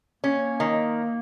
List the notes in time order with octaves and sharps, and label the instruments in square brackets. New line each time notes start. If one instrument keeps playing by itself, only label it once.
[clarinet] A#3 [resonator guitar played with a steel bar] C#4
[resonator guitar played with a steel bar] D#3